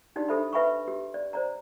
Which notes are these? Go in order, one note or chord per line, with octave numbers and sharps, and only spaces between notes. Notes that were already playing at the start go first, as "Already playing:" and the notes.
D4 D#4 F4 G4 D5
D4 G4 A4 C5 E5 B5
B4 E5 G#5 B5 C#6
G4
D5
C5 D5 A#5